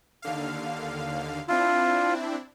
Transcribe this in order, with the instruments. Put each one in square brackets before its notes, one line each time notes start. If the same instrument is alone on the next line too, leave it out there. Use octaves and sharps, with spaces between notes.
[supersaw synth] D#2 D3 F5
[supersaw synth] C4 D4 E4 [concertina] F4